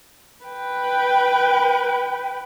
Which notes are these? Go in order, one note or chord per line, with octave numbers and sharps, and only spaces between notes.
B4 G5